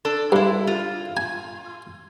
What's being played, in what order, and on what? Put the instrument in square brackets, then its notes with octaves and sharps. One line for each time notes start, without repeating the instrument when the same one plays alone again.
[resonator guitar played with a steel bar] D4 A4
[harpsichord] G2 [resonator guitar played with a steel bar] G#3 E4
[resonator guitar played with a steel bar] F4
[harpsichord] G#5